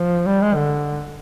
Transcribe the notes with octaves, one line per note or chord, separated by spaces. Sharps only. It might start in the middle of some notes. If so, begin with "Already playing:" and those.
Already playing: F3
G3
G#3
D3